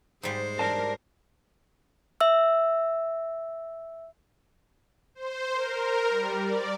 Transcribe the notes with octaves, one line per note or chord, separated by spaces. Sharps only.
G#2 G3 G#3 C5
A#4 D5 A5
E5 E6
C5
A#4
G3
D5